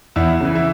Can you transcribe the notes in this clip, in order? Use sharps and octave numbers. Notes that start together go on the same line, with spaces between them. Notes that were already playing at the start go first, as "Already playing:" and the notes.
E2 E4
C#3 E3
E4